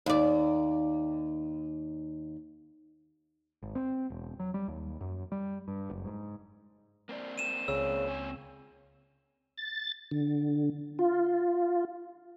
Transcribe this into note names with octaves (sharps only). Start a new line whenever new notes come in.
D#2 D5
G#1
C4
E1
F#3
G3
D#2
F#2
G3
G2
F#1
G#2
A#3 C4 D5
D#7 E7
C#2 C#3 E6
C4 C#5 G#5
A6
D3
F4